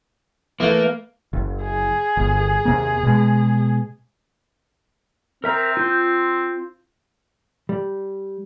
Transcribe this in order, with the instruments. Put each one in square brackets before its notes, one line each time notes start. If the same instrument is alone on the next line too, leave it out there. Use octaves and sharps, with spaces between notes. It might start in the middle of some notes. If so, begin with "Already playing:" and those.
[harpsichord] E3 A3 [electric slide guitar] A#3
[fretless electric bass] F#1
[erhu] G#4
[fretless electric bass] G1
D#2 C3 A#3
B2 G#3
[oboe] C4 [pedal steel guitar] A#4 E5 A#5
[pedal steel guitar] F4 G6
[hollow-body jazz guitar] G3